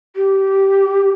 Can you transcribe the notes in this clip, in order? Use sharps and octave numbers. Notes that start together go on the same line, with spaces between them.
G4